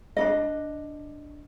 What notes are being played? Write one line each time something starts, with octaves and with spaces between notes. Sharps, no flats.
D4 D#4 D#5